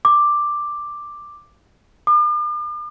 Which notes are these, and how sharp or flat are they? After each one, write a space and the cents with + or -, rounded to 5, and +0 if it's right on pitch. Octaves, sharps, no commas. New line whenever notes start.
D6 +5
D6 +45